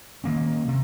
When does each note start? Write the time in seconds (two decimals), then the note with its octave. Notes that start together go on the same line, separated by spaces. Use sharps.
0.24 D#3 A#3 C#4
0.68 C3